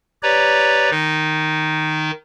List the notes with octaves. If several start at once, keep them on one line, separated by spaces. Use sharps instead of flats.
G4 B4 C#5 D5 A#5
D#3 D#4